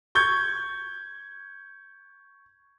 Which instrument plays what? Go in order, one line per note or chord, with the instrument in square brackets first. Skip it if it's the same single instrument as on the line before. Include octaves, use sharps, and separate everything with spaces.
[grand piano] C#6 G6 G#6